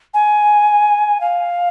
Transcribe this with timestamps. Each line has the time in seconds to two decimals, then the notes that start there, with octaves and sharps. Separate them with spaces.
0.14 G#5
1.21 F5